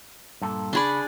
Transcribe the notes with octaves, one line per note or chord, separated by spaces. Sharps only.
G2 A#2 A4
C#3 D4 G#4 D5 B5